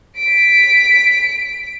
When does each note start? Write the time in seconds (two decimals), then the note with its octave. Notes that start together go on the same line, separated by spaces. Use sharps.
0.18 B6 D7